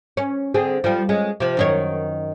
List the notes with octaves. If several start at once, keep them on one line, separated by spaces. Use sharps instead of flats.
C#4
D3 C4 G#4
F3 G3
G#3 C#4
C3 F3
F#2 D#3 C#5